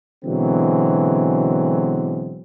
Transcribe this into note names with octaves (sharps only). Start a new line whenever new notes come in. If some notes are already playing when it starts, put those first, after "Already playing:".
B2 D3 E3 F#3 G#3 C4